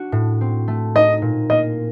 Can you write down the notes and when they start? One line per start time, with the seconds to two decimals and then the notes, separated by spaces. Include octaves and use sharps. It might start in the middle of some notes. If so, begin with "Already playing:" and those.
Already playing: D4 F#4
0.12 A2
0.41 C4
0.68 A3
0.95 D#4 D#5
1.22 A#2
1.50 A#3 D#5